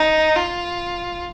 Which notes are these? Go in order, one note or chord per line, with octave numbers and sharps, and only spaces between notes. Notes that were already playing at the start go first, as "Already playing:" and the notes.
Already playing: D#4
F4